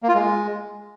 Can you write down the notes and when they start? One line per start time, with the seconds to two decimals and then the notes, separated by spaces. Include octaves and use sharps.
0.03 A#3
0.09 F4
0.14 G#3